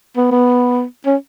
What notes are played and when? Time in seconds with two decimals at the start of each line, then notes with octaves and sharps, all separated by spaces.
0.17 B3
0.31 B3
1.06 C#4